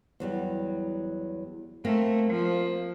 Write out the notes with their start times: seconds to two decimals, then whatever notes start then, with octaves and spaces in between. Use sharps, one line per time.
0.20 E2 F#3 G3
1.85 A3 A#3 C4 A#4
2.30 F3